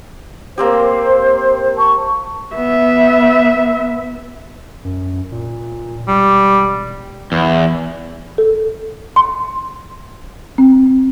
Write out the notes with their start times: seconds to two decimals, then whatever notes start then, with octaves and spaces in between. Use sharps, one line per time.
0.58 A#3 C4 G4 C5
1.76 A5 C#6
2.55 B3 E5
4.85 F#2
5.32 A#2
6.08 E1 G3
7.32 E2
8.38 A4
9.16 C6
10.58 C4